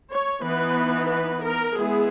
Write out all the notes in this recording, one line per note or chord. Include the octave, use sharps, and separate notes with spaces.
C#5
E3 B3 D#4 B4
B4
A#4
G#3 B3 E4 G#4